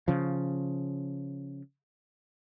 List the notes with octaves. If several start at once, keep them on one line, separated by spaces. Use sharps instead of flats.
C#3 F3